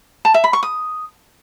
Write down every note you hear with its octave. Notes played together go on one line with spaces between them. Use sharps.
A5
E5
B5
C#6
D#6